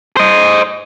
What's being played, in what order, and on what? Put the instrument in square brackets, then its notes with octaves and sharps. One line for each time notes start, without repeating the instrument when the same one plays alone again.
[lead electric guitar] C5 D#5